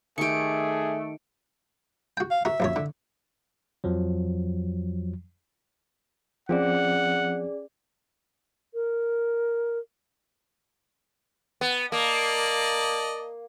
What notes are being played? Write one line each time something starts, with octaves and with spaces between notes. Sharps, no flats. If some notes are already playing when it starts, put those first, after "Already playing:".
D#3 A3 G4 G#4 C#7 D7
F#4 G5
F5
F#4 A#4 E5
A#1 F#2 C#5
D3
F2 F3 F#3
F3 C4 C#4 G#4 D5 F#5
A#4
B3
A#3 D5 D#5 A5